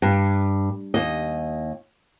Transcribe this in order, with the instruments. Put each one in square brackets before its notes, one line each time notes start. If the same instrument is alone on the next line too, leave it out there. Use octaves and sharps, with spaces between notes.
[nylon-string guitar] G2
D#2 D#5